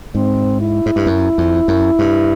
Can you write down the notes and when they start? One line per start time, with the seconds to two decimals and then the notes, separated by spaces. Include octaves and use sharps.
0.15 G#2 C4
0.61 E4
0.86 G#2
0.96 G2
1.07 F#2
1.38 F2
1.68 F#2
1.99 G2